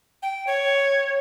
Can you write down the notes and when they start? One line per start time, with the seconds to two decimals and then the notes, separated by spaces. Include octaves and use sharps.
0.22 G5
0.47 C#5